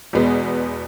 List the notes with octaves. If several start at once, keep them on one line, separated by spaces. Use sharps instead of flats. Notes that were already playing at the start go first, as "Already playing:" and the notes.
E2 B2 G#3 B3